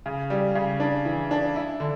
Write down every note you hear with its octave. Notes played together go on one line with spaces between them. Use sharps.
C#3
G3
C#3
D4
E3
D4
E4
D3